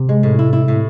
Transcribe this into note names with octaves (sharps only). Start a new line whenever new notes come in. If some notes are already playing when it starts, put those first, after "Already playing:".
Already playing: C3
G#3
A2
E4
E4
A2